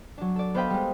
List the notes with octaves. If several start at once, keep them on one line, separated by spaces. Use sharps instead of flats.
F#3 D4
A4 D5
B3 C5 D#5 F5 G5 B5
G3 G#3